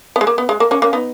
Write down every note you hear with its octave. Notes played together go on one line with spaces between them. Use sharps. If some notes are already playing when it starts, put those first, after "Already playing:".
B3
G#3
A#3
B3
G#3
A#3
A#3 C#4
A#3 C#4
B3 D#4